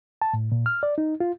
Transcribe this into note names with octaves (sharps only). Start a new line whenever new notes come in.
A5
A2
A#2
F6
D5
D#4
F4